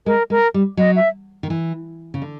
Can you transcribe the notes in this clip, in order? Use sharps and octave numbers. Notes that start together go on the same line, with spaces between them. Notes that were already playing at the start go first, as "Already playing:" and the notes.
G#3 A#4
G#3 A#4
G3
F#3 D#5
E5
D#3
E3
C#3
D3